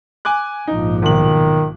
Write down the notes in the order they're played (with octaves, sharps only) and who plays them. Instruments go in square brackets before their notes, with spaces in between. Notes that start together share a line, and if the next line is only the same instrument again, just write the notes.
[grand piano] G#5 D6 F#6
[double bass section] A#1 G#2 F3 [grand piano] D#4
[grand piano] B1 F#7 [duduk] D#3